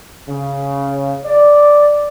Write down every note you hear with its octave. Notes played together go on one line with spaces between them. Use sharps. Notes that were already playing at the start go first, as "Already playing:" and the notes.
C#3
D5